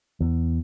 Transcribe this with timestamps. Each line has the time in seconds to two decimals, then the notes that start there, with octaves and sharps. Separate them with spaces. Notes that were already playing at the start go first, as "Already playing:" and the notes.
0.21 E2